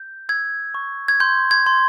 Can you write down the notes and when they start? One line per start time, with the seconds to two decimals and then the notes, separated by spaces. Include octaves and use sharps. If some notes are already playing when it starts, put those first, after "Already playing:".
Already playing: G6
0.29 E6 G#6
0.74 C#6
1.08 G#6
1.20 C6 G6
1.51 G#6
1.66 C6